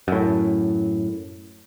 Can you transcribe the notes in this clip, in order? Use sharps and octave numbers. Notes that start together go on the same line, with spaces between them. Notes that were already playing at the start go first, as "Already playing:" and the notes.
F#2 A2